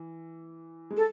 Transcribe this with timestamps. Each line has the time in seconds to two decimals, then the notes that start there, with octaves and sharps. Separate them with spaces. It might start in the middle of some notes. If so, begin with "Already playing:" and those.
Already playing: E3
0.91 G#3
0.97 A4